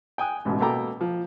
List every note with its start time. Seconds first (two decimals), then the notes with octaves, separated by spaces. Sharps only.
0.18 G5 G#5 D#6 F#6
0.45 A1 G#2 B2
0.60 B2 A#3 A4 G5 A#5 D6
1.01 F3